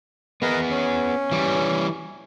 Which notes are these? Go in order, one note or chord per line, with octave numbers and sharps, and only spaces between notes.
B3 G#4 A#4 B4 D#5
C#4
E3 G3